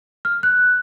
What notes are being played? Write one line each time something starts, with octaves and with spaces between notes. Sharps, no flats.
F6
F#6